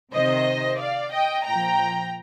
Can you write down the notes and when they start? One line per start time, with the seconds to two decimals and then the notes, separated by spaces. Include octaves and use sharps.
0.13 C3 D#3 C5 D#5
0.79 D5 F5
1.12 D#5 G5
1.46 A#2 F3 G5 A#5